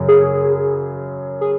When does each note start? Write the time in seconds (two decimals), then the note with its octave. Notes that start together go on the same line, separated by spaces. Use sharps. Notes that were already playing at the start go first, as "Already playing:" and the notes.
Already playing: F#2 C#3 F#3
0.08 G#4
1.41 G#4